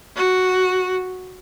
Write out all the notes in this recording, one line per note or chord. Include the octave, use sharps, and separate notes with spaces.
F#4